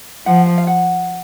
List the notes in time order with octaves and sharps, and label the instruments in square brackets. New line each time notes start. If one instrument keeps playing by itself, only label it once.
[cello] F3 [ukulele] F#5
[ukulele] F5
F5
F#5